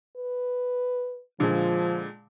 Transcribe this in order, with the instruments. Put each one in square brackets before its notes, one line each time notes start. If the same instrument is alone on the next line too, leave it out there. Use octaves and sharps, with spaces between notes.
[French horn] B4
[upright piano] A#2 D3 G#3 [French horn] F3